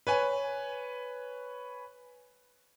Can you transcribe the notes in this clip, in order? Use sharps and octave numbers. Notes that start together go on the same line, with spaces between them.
B4 C#5 G#5